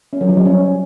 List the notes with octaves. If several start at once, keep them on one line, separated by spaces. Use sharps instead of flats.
C#4
F#3
F3
G3
C#4